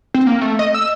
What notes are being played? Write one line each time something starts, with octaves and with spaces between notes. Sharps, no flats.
C4
A#3
A3
D#5
E6